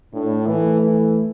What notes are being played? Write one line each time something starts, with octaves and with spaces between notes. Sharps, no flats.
A2 D4
E3 A3
E3